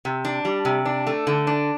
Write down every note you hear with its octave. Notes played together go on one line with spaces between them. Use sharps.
C3
D4
G3
C3
D4
A3
D3
D4